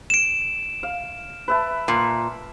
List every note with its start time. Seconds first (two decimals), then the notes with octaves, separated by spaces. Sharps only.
0.10 D7 E7
0.83 F5
1.48 B4 E5 A5
1.88 A#2